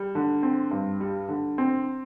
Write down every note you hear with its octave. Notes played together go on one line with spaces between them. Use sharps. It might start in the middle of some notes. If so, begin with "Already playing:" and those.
Already playing: G3
D3
C4
G2
G3
D3
C4